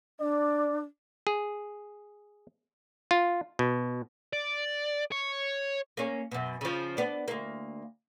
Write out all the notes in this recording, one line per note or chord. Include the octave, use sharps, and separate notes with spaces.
D4 D5
G#4
F4
B2
D5
C#5
A#3 C#4
F#2 B2
C#3 F3
B3 D4
D2 A#3